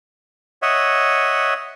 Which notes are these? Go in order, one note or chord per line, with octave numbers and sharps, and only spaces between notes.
C#5 D#5 E5 F#5